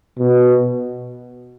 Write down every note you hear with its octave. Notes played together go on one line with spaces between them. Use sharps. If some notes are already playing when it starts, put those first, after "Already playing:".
B2